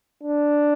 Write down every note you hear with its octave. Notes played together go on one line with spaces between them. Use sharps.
D4